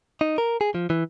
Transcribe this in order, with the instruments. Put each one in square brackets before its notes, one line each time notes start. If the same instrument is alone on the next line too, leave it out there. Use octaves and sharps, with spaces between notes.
[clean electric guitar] D#4
A#4
G#4
F3
E3